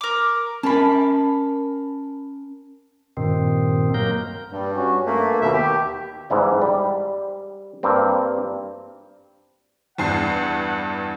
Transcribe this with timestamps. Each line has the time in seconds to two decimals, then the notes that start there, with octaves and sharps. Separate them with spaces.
0.01 A#4 D6
0.63 C#4 A#4 G#5 A5 B5
3.17 G2 A#2 D#3 C4
3.94 F#3 A#3 A#4 G6
4.52 G2 G3
4.74 C#4 F#4
5.06 G2 A3 A#3
5.41 D#2 B2 D#3 E5
5.53 G4
6.30 G#2 E3 G3
6.62 G3
7.83 G2 A#3 C4
9.98 E2 G2 F#5 C7